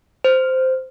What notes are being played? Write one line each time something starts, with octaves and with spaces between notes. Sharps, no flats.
C5